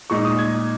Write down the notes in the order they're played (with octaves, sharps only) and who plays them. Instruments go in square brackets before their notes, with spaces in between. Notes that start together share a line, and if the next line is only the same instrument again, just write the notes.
[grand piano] A#2 G#3 D#4 C#6
D#6
G#6